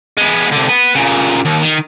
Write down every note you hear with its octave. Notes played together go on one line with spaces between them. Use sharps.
G#3 B3
C2 D3
B3
A#2 C#3
D#2
D#3